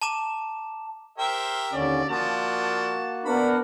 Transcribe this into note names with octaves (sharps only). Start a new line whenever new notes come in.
A5 A#5 D6 E7
G4 A#4 C5 E5
D#2 D3 C#4 D5
F3 A#3 D4 F#4 A5
B3 D4 A#4 F#5 B5